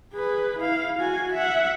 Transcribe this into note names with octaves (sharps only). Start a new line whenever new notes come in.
G#4 B4
E4 F5
F#4 G#5
E5 F#5